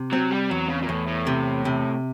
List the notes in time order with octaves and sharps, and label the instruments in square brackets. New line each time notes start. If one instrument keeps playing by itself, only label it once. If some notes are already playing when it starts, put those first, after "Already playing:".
Already playing: [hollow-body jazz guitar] C3
[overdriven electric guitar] F#3 [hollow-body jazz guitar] C4
[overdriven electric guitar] G3
[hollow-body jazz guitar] E2 [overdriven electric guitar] F#3
[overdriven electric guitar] C#3
A#2
[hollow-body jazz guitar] E2 [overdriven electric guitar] A2
[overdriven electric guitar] A2
[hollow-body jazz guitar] C3
C3